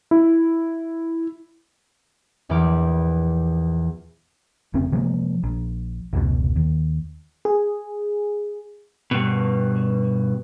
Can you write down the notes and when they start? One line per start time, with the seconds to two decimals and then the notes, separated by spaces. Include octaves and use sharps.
0.11 E4
2.49 A#1 E2 E3 B5 D6 F6
4.74 F1 C#3 C4
4.92 C3 F3 G#3 A#3
5.43 A#1
6.13 F1 C#2 B2
6.56 D#2
7.45 G#4
9.11 G2 B2